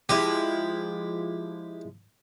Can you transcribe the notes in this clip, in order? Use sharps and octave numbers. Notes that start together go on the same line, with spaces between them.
F3 G#3 E4 G4